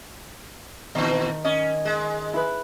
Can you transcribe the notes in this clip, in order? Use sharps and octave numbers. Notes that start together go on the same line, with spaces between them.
A#2 D#3 E3
C#4 D#5
G#3
E4 B4